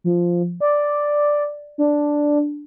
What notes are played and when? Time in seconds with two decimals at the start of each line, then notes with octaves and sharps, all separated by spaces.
0.04 F3
0.61 D5
1.78 D4